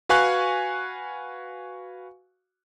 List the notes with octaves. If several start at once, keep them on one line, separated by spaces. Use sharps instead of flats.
F#4 B4 F5 G#5 C#6 F#6